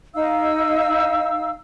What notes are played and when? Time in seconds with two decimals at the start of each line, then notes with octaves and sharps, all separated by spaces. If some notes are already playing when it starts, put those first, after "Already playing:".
0.14 D#4 F5 E6